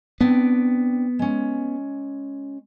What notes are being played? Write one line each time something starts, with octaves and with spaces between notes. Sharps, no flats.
B3 C4 D4 G5
G#3 C#4